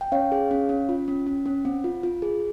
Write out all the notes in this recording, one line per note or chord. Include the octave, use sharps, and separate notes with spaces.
G5
C#4 C#5 F5
G#4
C#4
C#4
F4
C#4
C#4
C#4
C4
F4
F4
G#4